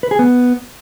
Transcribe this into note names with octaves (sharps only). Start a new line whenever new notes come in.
B4
G#4
B3